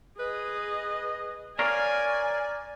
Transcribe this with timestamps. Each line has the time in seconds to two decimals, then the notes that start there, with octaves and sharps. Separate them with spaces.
0.19 G#4 B4 D#5
1.59 A#4 C#5 D5 F5 G#5